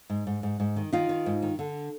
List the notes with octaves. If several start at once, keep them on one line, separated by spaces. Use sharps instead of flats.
G#2
G#2
G#2
G#2
D#3
D#3 D#4 F4
D#3
G#2
D#3
D3